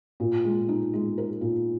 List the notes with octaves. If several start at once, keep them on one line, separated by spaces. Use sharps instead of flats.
A#2
G#3
D#4
G#3
A#4
A#2